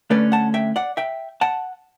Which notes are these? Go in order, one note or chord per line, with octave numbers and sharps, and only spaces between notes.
D2 D3 A3 C#4 B4 D5
F#5 A5
E5 G5
D5 F#5
E5 G5
F#5 A5